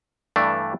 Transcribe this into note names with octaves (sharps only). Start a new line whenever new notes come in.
G2 E3 A3 D4